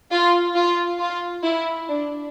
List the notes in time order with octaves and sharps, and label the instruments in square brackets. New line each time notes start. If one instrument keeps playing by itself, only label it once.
[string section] F4
F4
F4
E4
D4